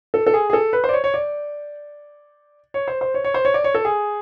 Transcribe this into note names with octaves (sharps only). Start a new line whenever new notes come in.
A4
A4
G#4
G#4
A4
B4
C5
D5
C#5
C#5
D5
C#5
C5
C5
C#5
C#5
C5
C#5
D5
C#5
A4
G#4